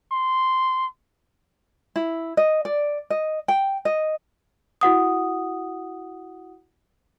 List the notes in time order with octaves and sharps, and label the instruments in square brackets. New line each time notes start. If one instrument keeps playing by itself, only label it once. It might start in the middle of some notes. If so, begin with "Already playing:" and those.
[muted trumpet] C6
[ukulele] E4
D#5
D5
D#5
G5
D#5
[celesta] E4 F#4 F#5 D#6